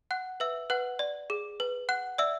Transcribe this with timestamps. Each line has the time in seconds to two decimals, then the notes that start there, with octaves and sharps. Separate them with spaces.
0.11 F#5 F#6
0.40 B4 E5 E6
0.70 B4 F#5 F#6
0.99 D5
1.30 G#4
1.60 B4
1.89 F#5 F#6
2.18 D5 E5 E6